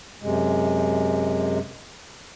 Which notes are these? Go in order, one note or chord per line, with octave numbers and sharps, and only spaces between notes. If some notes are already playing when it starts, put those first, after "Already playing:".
F#2 C3 G#3